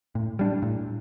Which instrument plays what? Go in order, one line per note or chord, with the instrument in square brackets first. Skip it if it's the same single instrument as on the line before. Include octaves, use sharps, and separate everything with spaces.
[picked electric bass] A2
G3 D4
A2